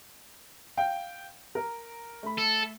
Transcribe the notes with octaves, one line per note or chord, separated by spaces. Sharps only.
F5 G5
A#4
A3 B5
A4